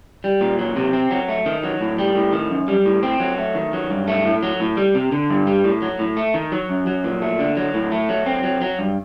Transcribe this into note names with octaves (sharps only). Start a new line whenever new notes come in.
G3
A#2
F#3
C3
C4
F#3
A3
D#3
F#3
A2
G3
A2
D#3
F#2
G3
A2
C4
F#3
A3
D#3
F#3
G2
A3
A2
F#3
A2
G3
C3
D3
G2
G3
A2
F#3
A2
A3
D#3
F#3
F#2
F#3
A#2
A3
D3
F#3
A2
A3
F#3
C4
F#3
F#3
G2